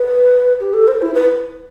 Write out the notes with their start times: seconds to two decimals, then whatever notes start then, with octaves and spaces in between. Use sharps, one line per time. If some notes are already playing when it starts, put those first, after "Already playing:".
Already playing: B4
0.60 G4
0.74 A4
0.88 C5
1.02 E4
1.14 B4